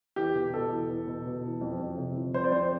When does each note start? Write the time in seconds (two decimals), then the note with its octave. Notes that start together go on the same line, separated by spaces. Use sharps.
0.16 E2 G4
0.35 B2
0.54 B2 A4
0.71 E2
0.89 E2
1.07 B2
1.26 B2
1.43 E2
1.61 F2
1.79 F2
1.97 C3
2.16 F3
2.34 F2 C5
2.44 D5
2.51 F2 C5